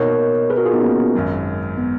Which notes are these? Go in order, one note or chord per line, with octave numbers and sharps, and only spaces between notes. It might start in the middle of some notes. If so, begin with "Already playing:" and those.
Already playing: B2 A#3 D#4 A#4 C#5
G#4 B4
F#4 A#4
F4 G#4
B3 D#4
A#3 C#4
G#1 F#2 D#3
B3